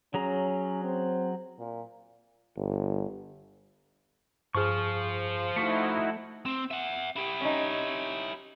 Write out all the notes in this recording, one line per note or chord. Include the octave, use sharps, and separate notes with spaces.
F#3 C#4 G#4 A#5
C4
A#2
G1
G2 F3 G#4 C#6 F6
A3 D#4 E4 F#4 C#6 B6 C#7
C4
E5 F#5
E4 G4
C#4 D#4